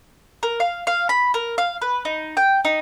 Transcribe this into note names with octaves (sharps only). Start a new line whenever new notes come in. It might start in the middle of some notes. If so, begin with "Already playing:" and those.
A#4
F5
F5
B5
A#4
F5
B4
D#4
G5
D#4